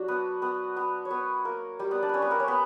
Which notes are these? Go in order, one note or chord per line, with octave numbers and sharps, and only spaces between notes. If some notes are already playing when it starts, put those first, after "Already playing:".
Already playing: F#3 D4 F#4
B3 B4
B3 B4
B3 B4
C#5
B3 B4
A#3 A#4
G3 G4
B3 B4
D4 D5
C#4 B4 C#5
B3 B4
A#3 A#4
C#4 C#5
B3 B4